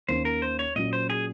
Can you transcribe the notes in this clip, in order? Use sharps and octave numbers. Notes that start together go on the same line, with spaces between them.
D#2 D#3 A#3 C#4 C5
A#4
C5
C#5
A#2 F#3 C#4 D#5
C5
G#4